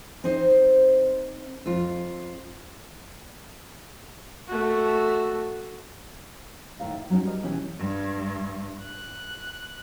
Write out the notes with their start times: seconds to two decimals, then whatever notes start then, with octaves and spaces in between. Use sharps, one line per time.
0.24 C4 D#4 C5 D#5
1.66 F2 F4
4.48 A3 F#4
6.80 D#2 A2 A#4 F5
6.94 E5
7.10 F#3 G3 B3 C#4 D#4
7.23 G3 A#4 D#5
7.43 B2 E3 C#4 G4
7.79 G2
8.82 F#6